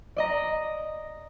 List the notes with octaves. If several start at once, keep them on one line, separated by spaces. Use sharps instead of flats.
D5 D#5 A#5